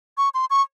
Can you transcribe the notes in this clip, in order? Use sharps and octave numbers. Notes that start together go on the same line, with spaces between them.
C#6
C6
C#6